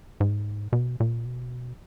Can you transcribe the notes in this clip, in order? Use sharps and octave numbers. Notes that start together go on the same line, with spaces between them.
G#2
B2
A#2
B2